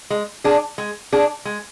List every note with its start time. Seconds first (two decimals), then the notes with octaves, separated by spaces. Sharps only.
0.10 G#3
0.44 D4 G#4
0.78 G#3
1.13 D4 G#4
1.45 G#3